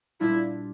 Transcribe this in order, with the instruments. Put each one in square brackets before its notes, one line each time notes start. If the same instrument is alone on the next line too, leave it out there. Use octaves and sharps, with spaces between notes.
[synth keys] A#2 G3 D4 F4 [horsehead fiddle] E4